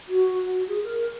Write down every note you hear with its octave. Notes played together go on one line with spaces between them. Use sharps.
F#4
F#4
G#4
A#4